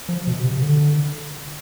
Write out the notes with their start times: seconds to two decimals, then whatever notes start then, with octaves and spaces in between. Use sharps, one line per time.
0.09 F3
0.27 B2
0.44 C3
0.62 D3